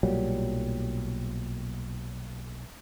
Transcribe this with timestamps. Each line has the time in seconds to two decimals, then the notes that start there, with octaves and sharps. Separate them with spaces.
0.03 B1 A#2 F#3 G3